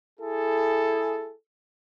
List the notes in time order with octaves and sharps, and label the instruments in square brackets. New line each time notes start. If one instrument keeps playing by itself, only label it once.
[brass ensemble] E4 G#4 A4